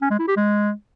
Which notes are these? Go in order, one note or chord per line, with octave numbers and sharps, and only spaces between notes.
C#4
G#3
E4
G4
G#3